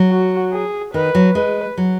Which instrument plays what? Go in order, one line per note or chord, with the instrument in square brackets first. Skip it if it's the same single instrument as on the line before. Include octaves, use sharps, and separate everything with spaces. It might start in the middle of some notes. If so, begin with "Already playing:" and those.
Already playing: [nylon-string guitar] F#3
[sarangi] F#4
G#4
[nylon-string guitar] D#3 [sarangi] B4
[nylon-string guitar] F#3
[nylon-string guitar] G#3 [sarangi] B4
[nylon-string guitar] F#3